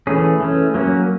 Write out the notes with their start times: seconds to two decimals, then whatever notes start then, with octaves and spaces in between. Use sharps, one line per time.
0.07 E3 A3 C#4 G#4
0.40 E3 A3 C#4
0.74 F#3 A#3 C#4